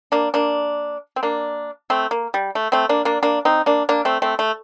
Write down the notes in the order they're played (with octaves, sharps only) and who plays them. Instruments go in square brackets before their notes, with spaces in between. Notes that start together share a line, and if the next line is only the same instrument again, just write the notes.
[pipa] A#3 D4
A#3 D4
C4
A#3 D4
A3 C4
A#3
G3
A3
A3 C4
A#3 D4
A#3 D4
A#3 D4
C4 D#4
A#3 D4
A#3 D4
A3 C4
A3 C4
A3